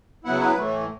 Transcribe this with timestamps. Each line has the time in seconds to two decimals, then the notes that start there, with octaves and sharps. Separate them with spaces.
0.24 C#3 F#3 B3 E4 F#5
0.41 B4
0.58 A2 E3 A3